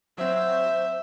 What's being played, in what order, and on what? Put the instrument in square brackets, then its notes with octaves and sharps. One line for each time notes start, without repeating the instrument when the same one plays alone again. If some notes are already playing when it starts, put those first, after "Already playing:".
[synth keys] F#3 C4 [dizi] C5 [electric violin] E5